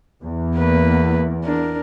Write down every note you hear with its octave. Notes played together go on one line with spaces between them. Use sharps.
E2
A#3 B4
D4 A#4